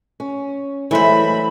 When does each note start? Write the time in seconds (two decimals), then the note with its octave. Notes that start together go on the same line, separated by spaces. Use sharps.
0.20 C#4
0.91 E3 F#3 G#3 A3 C5 B5